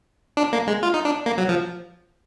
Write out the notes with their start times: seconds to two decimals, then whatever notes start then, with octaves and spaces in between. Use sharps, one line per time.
0.37 D4
0.53 A#3
0.67 G#3
0.83 F4
0.94 D#4
1.05 D4
1.26 A#3
1.38 F#3
1.49 F3